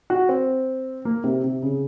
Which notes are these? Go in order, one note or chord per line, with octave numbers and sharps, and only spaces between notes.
F#4
C4
A#3
C3
C3
C#3